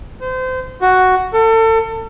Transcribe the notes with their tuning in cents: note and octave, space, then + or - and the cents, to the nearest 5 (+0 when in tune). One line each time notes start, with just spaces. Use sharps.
C5 -30
F#4 +5
A4 +35